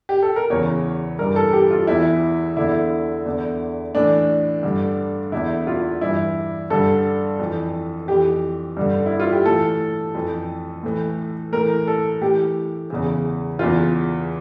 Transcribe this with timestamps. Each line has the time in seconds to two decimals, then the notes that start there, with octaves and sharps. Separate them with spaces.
0.09 G4
0.22 A4
0.36 A#4
0.50 E2 C#3 E3 C#5
1.19 G2 E3 A#4
1.36 A4
1.53 G4
1.71 F4
1.87 E2 E3 E4
2.57 E2 D3 E4
3.25 E2 D3
3.95 A2 E3 D4
4.63 G2 D3
5.32 E2 D3 E4
5.67 F4
6.01 G2 E3 E4
6.70 G2 D3 A4
7.39 F2 E3
8.08 F2 E3 G4
8.77 G2 D3
9.06 E4
9.20 F4
9.32 G4
9.46 A2 E3 A4
10.15 F2 E3
10.83 A2 E3
11.52 A2 E3 A#4
11.88 A4
12.21 A2 E3 G4
12.90 E2 C#3 E3
13.59 E2 C#3 E3 F4